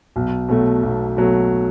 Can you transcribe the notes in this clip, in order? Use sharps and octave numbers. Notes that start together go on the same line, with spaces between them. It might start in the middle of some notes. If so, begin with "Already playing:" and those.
B1
B2 F#3 A3
B1
B2 F#3 A3